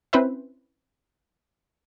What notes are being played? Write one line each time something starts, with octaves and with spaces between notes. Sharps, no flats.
C4 C#4 E4 B4 C5 E5